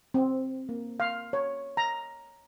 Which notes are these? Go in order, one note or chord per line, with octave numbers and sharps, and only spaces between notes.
C4
A#3
F5
C#5
A#5